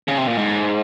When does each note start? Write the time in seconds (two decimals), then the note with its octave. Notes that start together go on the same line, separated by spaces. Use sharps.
0.08 C#3
0.18 C3
0.27 A#2
0.37 G#2